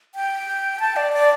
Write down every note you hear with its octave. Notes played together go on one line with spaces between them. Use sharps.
G5
A5
D5
D5